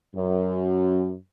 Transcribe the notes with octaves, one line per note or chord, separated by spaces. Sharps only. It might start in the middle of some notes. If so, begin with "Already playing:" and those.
F#2